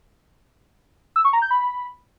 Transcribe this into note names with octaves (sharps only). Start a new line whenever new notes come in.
E6
C#6
A#5
G6
B5